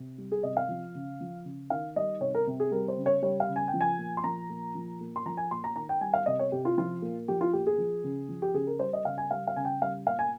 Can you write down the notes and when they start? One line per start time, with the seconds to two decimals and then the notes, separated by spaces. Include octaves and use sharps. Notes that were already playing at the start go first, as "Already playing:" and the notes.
Already playing: C3
0.18 G3
0.32 G#4
0.43 C3 D#5
0.57 F5
0.69 F3
0.95 C#3
1.21 F3
1.45 C#3
1.70 D#3 F5
1.96 G3 D#5
2.21 C3 C#5
2.35 A#4
2.47 C3
2.60 G#4
2.71 G3 A#4
2.88 C5
2.98 C#3
3.06 C#5
3.22 G3 C#5
3.40 F5
3.49 C#3
3.56 G#5
3.68 G5
3.74 F3
3.81 G#5
3.98 A#2
4.17 C6
4.24 F3 A#5
4.50 A#2
4.75 F3
5.00 A#2
5.16 C6
5.26 F3 A#5
5.37 G#5
5.51 A#2 C6
5.64 A#5
5.76 D#3 A#5
5.89 G5
6.01 G3 G#5
6.14 F5
6.26 C3 D#5
6.39 C#5
6.52 C3 G4
6.65 F4
6.78 F3 F4
7.02 A#2
7.28 F3 G4
7.41 F4
7.53 A#2 G4
7.67 G#4
7.78 F3
8.04 C#3
8.29 F3
8.42 G4
8.54 C#3 G#4
8.67 A#4
8.79 G3 C5
8.93 D#5
9.05 C#3 F5
9.18 G#5
9.31 G3 F5
9.47 F5
9.56 C#3 G#5
9.65 G5
9.82 G3 F5
10.07 A#2 F5
10.19 G#5